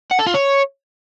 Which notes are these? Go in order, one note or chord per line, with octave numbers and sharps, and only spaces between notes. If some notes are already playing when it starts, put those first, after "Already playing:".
F#5
A4
F4
C#5